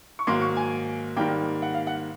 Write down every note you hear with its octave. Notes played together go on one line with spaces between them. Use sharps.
C#6
G#2 D#3 F#3 A#3 C6
C#6
G#5
G#2 D#3 G3 A#3 G5
F#5
F5
F#5